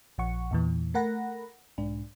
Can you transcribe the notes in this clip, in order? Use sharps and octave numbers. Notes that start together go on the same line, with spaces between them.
A#1 F3 F#5 C#6
E2 A#2 E3
A3 A#4 F#5 B5 A#6
B1 G#2 D4